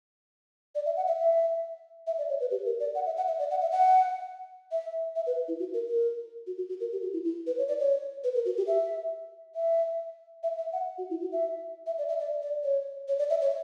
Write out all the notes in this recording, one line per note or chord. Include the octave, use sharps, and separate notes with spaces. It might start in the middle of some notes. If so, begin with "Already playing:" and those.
D5
E5
F#5
E5
E5
E5
D5
C#5
B4
G4
A#4
D5
F#5
E5
F#5
E5
D5
F#5
E5
F#5
E5
E5
B4
E4
F#4
A#4
A#4
F#4
F#4
F#4
A#4
G4
F#4
E4
E4
B4
C#5
D5
C#5
B4
A#4
F#4
G4
E5
E5
E5
E5
F#5
F#4
E4
F#4
E5
E5
D5
E5
D5
D5
C#5
C#5
D5
E5
C#5